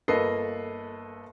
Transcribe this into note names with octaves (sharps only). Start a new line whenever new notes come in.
G1 A#3 A4 B4 D#5 C7